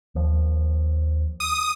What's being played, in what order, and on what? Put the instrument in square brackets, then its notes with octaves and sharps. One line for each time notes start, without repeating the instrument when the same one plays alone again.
[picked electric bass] D#2 F3
[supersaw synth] D#6